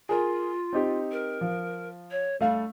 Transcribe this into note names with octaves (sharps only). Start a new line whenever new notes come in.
F4 G#4 A#4
C4 D#4 G4
A#4
F3
C#5
G3 A3 F5